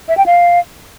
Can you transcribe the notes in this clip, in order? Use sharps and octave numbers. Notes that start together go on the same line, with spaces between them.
E5
G5
F5